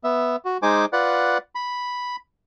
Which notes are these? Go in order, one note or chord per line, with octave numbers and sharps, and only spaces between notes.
B3 E5
F#4
G#3 D#4 C5 G#5 D6
F4 B4 D5 F#5
B5